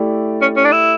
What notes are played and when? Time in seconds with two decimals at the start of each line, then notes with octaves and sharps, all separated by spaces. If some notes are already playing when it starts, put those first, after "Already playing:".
Already playing: A3 E4 G4 D5
0.42 C#4
0.56 C#4
0.65 D4
0.72 E4